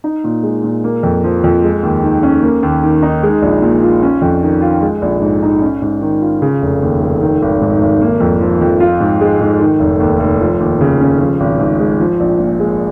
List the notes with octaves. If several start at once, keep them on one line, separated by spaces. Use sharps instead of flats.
D#4
A#2
G#3
A#2
A#3
F2
F3
F2
G#3
D#2
D#3
C#4
A#3
D#2
D#3
D#4
G#3
A#1
A#2
F4
C#4
F2
D#3
F4
G#3
A#1
G#2
D#4
C#4
G#2
D#3
F4
C#3
F1
D#2
F1
D#3
G#1
G#2
G#1
A#3
F2
F3
F2
F4
G#2
G#3
G#2
D#3
F1
D#2
F1
F3
D#2
C#3
C#4
F3
G#1
G#2
G#3
F3
A#1
A#2
G#3